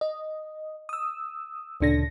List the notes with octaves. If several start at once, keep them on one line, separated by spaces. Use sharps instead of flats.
D#5
D#6 E6
D2 A#2 C#3 D4 A4 A#6